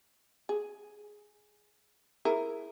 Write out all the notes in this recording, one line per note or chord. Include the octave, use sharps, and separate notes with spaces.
G#4
E4 G#4 A#4